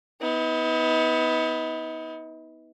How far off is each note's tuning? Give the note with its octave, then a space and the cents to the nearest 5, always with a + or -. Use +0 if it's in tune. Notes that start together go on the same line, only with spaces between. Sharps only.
B3 +0 D#4 +40